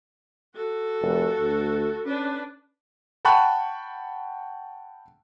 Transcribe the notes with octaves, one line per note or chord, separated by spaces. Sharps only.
F#4 A4
F1
D2
C#4 D4 B4
F#5 G5 A5 B5 C#6 F#6